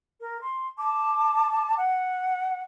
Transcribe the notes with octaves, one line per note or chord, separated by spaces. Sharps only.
A#4
C6
A5 D6
F#5